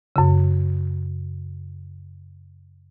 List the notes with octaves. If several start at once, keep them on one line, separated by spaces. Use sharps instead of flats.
F#2 C#3